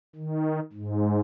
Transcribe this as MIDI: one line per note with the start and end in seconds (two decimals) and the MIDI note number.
0.16 0.60 51
0.73 1.20 44